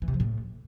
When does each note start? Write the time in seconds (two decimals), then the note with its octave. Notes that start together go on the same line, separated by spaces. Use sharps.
0.02 E3
0.08 C3
0.14 F3
0.20 A2